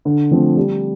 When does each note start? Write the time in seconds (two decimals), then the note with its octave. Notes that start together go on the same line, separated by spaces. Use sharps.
0.05 D3
0.31 F3 A3 C4
0.57 G3